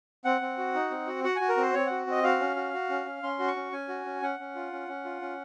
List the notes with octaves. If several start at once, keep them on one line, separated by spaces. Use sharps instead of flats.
C4 F#5
C4
F#4
D#4
C4
F#4
F#4 F#5
F#4 G#5
A#4
C4 C5
C4 C#5
F#4 F#5
C4 D#5
F#4 F5
C#4
F#4
F#4
C#4
C#4
C#4 C6
F#4
C#6
C#4
C#4 G#5
F#4
C#4
C#4 F#5
C#4
F4
C#4
C#4
F4
C#4